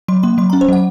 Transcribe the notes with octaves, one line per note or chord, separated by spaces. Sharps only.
F#3 C6
A#3 C6
F#3 C6
A#5
C#4
C5
F#3 F#5